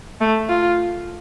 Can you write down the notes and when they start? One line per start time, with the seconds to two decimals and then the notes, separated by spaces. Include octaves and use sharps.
0.21 A3
0.49 F4